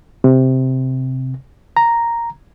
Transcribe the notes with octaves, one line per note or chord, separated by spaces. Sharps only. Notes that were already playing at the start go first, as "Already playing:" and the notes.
C3
A#5